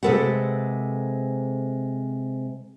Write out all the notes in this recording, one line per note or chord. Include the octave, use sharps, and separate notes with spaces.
C3 G#3 A4 B4 F#5